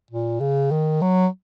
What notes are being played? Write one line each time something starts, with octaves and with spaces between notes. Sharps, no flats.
A#2
C#3
D#3
F#3